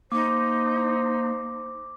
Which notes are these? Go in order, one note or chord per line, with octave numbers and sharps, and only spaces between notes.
A#3 D#4 C5 D6